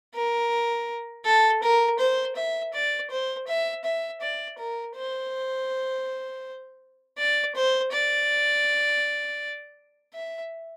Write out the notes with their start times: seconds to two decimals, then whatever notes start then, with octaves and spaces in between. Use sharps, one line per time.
0.14 A#4
1.25 A4
1.63 A#4
1.99 C5
2.36 E5
2.74 D5
3.11 C5
3.48 E5
3.85 E5
4.22 D5
4.59 A#4
4.96 C5
7.18 D5
7.55 C5
7.92 D5
10.14 E5